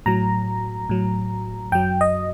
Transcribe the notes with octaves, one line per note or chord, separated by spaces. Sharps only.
A2 F#3 A#5
A2 F#3
F#2 F#3 G5
D#5